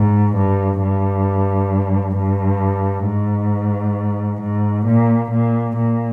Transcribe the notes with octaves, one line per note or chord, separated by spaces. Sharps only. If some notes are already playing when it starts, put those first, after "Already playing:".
Already playing: G#2
G2
G2
G2
G#2
G#2
A#2
A#2
A#2